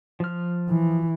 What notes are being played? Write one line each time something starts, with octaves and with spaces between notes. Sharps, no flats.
F3 F6
E3